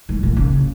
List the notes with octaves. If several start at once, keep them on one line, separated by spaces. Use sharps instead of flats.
G#2
A#2
C#3